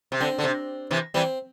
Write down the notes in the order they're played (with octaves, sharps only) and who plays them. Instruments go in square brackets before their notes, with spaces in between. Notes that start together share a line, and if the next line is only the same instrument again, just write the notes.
[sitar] C3
[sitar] D3 [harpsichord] C4
[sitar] D3
C3
C3 E3
[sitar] E3 G3 [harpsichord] C4